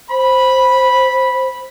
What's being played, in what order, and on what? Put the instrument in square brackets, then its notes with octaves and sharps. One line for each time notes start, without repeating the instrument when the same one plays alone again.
[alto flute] C5 [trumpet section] B5